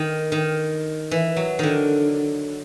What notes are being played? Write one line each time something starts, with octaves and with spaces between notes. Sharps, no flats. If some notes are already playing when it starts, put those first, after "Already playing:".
Already playing: D#3
D#3
E3
F#3
D3 D#3